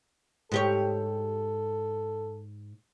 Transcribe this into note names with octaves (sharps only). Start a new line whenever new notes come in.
G#2 G4 A4 C#5